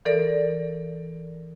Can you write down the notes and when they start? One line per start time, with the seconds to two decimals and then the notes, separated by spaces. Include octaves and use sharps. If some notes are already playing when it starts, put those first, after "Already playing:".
0.05 E3 A4 A#4 D5